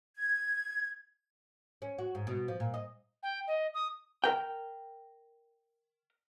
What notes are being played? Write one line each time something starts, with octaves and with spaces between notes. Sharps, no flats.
G#6
C#4
F#4
G#2
B2
F3
A#2
D#5
G5
D#5
D#6
A#4 G5